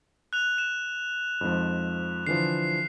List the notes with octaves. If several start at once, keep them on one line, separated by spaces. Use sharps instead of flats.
F#6 F7
E7
F2 G#2 F3
D3 E3 F3 C7